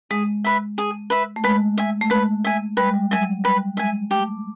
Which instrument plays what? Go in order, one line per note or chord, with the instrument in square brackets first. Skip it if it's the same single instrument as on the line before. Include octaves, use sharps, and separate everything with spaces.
[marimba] G#3 [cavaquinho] G#4
[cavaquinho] B4 E5
G#4
B4 E5
[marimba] A3
[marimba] G#3 [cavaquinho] B4
[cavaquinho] E5 G#5
[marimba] A3
[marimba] G#3 [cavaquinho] B4
[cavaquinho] E5 G#5
[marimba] G3 [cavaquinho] B4
[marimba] G#3
G3
[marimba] F#3 [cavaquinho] E5 G#5
[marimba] G3 [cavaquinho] B4
[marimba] G#3 [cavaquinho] E5 G#5
[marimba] A3 [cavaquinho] G4